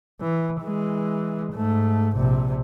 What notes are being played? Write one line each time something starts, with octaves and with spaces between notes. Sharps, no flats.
E3
E3 G#3
G#2 A3
A#1 C3